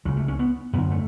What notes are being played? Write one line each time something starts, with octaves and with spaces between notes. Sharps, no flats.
C#2 C#3 F#3
A3
C#4
B3
F#2 D3 B3
A3